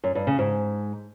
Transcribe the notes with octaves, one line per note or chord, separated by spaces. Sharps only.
F#2
G2
C#3
G#2